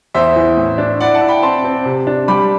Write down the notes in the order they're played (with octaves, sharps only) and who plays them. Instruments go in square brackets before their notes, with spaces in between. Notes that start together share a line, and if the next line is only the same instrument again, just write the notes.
[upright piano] E2 [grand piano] C5 E5
[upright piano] E3
A2
D4
[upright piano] E4 [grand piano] D5 F#5
[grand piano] F#5 A5
[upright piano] E4
[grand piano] G5 B5
[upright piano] C4 [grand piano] A5 C6
[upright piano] C4
C3
D4
[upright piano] G3 [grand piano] B5 D6